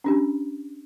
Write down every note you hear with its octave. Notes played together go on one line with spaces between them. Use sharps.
C#4 D4 G4